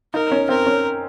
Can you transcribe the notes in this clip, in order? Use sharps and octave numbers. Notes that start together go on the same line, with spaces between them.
D#4 A#4
C#4
C4 A#4
C#4